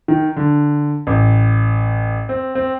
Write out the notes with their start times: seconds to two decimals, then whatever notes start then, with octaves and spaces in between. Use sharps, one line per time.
0.08 D#3
0.37 D3
1.07 A1
2.29 C4
2.55 C4